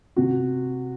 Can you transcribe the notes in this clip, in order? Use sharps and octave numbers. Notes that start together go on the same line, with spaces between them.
C3 F#4